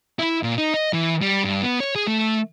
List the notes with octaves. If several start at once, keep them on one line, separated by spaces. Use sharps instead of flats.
E4
A#2
D#4
D#5
E3
G3
G2
B3
C#5
G#4
A3